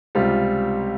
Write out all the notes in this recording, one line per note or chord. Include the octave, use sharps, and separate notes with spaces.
C#2 C3 G3 C4 F4